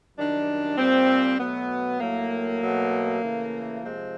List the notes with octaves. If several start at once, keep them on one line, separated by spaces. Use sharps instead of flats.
F#2 D#3 G3 D4
A#2 G3 C4
B2 F#3 A3 B3
A2 F#3 A3 A#3
B2 F#3 A3
C#3 E3 A3
C3 F3 G#3 C4